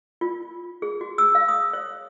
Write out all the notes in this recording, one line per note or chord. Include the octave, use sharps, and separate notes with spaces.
F4
G#4
F#4
E6
F5
D#6
C#5